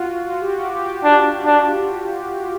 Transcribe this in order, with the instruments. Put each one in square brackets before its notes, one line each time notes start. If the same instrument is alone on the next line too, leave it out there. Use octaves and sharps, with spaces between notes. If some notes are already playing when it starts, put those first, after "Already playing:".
Already playing: [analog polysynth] F4 F#4
F4
G4
F#4
G4
[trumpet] D4
D4